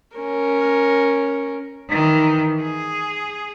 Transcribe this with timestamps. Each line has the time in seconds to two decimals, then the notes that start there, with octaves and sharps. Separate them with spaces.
0.17 C#4 A#4
1.90 D#3 E3
2.63 G#4